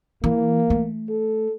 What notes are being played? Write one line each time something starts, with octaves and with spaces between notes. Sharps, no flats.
E3 A#3
A3
A4